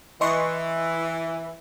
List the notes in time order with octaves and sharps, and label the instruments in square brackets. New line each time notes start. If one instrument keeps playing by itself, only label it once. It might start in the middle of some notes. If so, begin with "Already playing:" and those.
[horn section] E3 [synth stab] D#5 C6 C#6